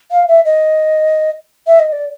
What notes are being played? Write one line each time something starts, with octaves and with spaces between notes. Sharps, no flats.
F5
E5
D#5
E5
D#5
D5